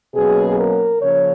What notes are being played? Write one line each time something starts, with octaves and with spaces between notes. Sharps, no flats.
B2 F#3 A#3 C#4 G#4
A#4
C#3 F3 A#3 C#4 C#5